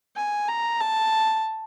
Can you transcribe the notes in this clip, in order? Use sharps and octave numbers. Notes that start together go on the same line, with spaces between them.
G#5
A#5
A5